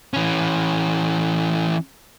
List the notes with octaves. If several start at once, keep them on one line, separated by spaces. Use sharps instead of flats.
E3 C#4